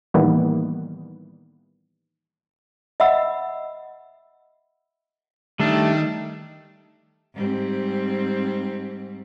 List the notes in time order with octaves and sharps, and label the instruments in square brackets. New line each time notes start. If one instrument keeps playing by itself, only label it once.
[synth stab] A2 D#3 E3 G3 A#3 B3
[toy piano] D#5 E5 F#5 B5 E6
[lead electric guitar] D#3 [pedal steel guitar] G3 A3 D4
[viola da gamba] G#2 G3 C4